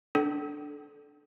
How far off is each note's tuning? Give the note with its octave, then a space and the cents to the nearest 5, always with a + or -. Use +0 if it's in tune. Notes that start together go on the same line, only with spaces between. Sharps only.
D4 +0 A4 -20 G5 -45